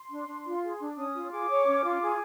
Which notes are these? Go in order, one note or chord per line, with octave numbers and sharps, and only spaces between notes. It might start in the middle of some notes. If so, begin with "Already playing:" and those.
Already playing: C6
D4
D4
F4
G#4
D4
C#4 D#6
F4
G#4 D6
C#5
C#4
F4
G#4